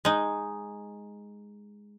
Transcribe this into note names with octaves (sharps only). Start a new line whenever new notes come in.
G#3 D#4